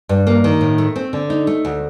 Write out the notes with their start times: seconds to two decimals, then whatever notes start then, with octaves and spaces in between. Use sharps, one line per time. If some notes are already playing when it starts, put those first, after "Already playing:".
0.09 G2
0.27 A#3
0.44 D#3
0.61 A2
0.78 A3
0.96 C4
1.13 D3
1.30 D#4
1.47 A3
1.65 D2